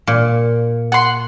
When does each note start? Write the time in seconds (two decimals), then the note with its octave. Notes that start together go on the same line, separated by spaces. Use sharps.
0.07 A#2
0.92 F#5 C6